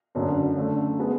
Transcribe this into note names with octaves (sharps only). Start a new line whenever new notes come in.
F#1 F#2 D3 F#3
F#2 D3 A3
G#3 B3 F#4